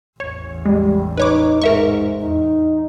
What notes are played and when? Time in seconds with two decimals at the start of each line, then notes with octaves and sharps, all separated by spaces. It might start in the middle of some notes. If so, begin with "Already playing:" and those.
0.20 A1 E2 C#5
0.66 G3 G#3
1.17 D#4 B4 C#5 D6
1.62 G#2 A#4 E5 C#6
2.21 E2 D#4